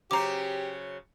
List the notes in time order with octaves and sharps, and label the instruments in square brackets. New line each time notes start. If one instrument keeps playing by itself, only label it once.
[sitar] C#3 F#3 C5 [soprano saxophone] G4 [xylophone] A#5 D6